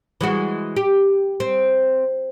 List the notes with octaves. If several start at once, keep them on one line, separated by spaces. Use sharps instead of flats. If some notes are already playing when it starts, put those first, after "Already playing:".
E3 G#3 F#4
G4
C4